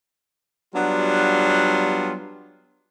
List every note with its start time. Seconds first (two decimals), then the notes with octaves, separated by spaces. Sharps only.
0.74 F#3 G3 B3 D4 F4